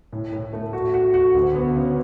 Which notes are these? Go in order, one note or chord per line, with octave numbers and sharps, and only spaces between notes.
A2
A2
A3
F#4
F#4
F#4
D2
B3
C#3